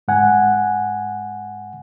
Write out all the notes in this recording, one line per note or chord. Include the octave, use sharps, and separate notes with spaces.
G#2 F#5 G#5